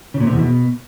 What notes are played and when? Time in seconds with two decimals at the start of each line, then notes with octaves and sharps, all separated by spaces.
0.14 C#3
0.20 A#2
0.27 C3
0.33 E2
0.39 B2